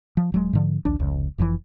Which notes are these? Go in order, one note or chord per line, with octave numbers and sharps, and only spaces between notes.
F3
D#1 F#3 G#3
G#2 D3 F3
A#1 D#2 D4
F1 C#2
F1 F2 C#3 E3